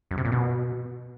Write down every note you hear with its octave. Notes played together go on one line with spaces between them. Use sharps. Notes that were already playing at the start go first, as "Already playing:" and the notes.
F#2
C3
A#2
B2